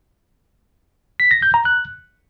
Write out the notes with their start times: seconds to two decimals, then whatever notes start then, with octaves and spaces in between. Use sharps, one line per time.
1.20 B6
1.31 A#6
1.42 G6
1.54 A#5
1.65 F#6